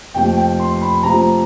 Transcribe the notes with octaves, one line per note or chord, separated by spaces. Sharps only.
F2 C3 F3 A3 G5
G5
C6
B5
C3 F3 A3 A#5